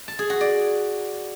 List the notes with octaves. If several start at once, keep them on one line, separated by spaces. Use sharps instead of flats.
A5
G#4
F#4
D5